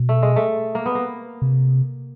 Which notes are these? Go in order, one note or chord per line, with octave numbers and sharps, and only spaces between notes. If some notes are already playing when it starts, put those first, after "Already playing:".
Already playing: B2
A3
G#3
A3
A#3
B3
A#3
C3